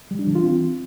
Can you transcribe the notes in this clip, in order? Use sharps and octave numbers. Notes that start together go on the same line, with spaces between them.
G3
D4
E3
F4
C4